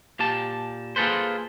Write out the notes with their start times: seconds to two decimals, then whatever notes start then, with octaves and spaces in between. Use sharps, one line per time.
0.19 A#2 G4 A5
0.96 A#3 F4 G#4 A4 B4 C5